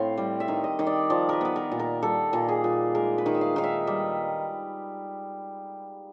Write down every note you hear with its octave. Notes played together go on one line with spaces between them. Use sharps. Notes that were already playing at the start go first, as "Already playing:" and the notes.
Already playing: A2 C4 F5
G3
E5
D#3
D#5
D#3 D#5
D5
F3 D5
A#4 B4
B3 B4
A#4
A#2
A#4
G3 A4
A#2
G#4
A#2
G#3 A#4
B4
D#3
E5
F5
D#3 F5
E5
G3